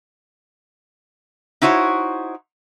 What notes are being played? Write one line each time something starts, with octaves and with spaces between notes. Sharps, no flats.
D#4 E4 F#4 C5 C#5